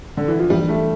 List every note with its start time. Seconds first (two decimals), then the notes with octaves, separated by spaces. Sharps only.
0.17 D3
0.28 E3
0.39 F3
0.50 G2 E3 G3 A#3 D4 G4
0.69 A3